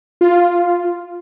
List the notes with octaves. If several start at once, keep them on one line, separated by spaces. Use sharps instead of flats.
F4